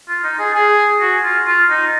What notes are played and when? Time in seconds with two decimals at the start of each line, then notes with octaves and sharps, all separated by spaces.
0.08 F4
0.24 D#4
0.39 G#4
0.54 G#4
1.01 F#4
1.23 F4
1.46 F4
1.70 D#4